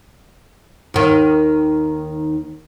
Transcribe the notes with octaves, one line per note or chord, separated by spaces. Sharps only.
D#2 D#3